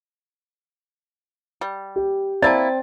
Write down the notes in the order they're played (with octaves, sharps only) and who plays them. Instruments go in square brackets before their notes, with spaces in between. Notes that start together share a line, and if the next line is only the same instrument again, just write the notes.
[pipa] G3
[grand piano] G4
[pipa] A#3 E4 [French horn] C4 [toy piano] D5 A5 [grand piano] A6